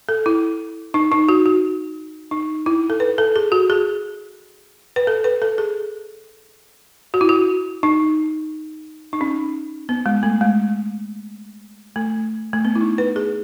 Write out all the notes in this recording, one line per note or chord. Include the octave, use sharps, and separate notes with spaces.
A4
E4
D#4
D#4
F#4
F#4
D#4
E4
A4
B4
A4
G#4
F#4
G#4
B4
A4
B4
A4
G#4
F#4
E4
F#4
D#4
D#4
C#4
B3
G#3
A3
G#3
A3
A3
B3
E4
D#4
B4
G#4